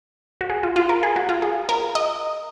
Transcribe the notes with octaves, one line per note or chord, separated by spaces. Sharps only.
F#4
G#4
F4
F4
A#4
G#4
F#4
F4
G#4
A#4
D#5